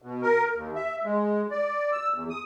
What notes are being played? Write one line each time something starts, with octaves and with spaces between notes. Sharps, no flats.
B2
A#4
D#2
E5
G#3
D5
E6
E2
D#6